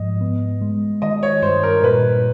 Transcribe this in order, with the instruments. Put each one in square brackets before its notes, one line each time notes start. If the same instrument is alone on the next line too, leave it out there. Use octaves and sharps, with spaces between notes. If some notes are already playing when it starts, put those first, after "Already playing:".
Already playing: [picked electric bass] G#2 F3 [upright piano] D#5
[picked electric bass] B3
G#3
[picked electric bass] D#3 [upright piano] D#5
[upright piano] C#5
[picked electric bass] G2 [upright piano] C5
[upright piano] A#4
[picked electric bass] A#2 [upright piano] B4